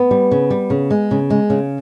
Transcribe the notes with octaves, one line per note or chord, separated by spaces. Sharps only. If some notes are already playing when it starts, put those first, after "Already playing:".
Already playing: B3
G3
C#3
G3
C#3
G#3
C#3
G#3
C#3